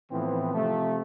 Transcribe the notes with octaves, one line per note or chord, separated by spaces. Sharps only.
A2 E3 F3 B3 C4
C3 F3 A3